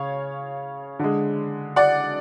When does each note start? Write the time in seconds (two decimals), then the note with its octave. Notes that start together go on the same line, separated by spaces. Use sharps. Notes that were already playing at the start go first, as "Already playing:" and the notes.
Already playing: C#3 C#5 F5
0.99 D3 G#3
1.76 D5 F#5